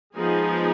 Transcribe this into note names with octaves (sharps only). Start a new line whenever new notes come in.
F3 G#3 B3 D#4 G#4